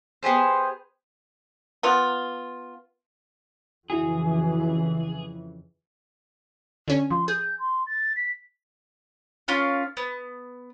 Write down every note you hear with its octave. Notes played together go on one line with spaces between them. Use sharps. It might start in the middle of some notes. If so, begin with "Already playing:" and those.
B3 G4 G#4 C5
B3 F4
F2 C#3 E3 E4 F#4 G#4
D3 C#4
F3 C6
G#4 G6
C6
A6
B6
A#3 C#4 F4 F5
B3